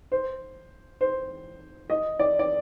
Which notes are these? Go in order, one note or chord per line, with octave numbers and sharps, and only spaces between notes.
C5
C5
D#5
D5
D5